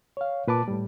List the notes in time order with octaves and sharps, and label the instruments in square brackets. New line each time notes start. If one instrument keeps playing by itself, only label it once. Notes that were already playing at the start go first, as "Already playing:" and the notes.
[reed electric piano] C#5 F5
A#2 B4 A5 D6
A2 G3